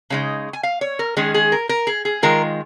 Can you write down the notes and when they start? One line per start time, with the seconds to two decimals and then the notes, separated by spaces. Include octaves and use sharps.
0.10 C#3 G#3 D#4
0.53 G#5
0.63 F5
0.81 C#5
0.99 A#4
1.17 D#3 G#3 C#4 G#4
1.34 G#4
1.52 A#4
1.69 A#4
1.87 G#4
2.05 G#4
2.23 D#3 G#3 F4 A#4